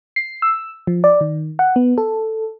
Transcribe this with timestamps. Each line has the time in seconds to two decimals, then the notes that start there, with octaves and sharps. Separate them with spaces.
0.16 C7
0.42 E6
0.87 F3
1.04 D5
1.21 D#3
1.59 F#5
1.76 B3
1.98 A4